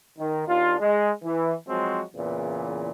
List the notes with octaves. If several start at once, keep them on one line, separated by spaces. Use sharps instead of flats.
D#3
D#2 D4 F4
G#3
E3
F3 F#3 G#3 C4 F#4
E2 A#2 C#3 E3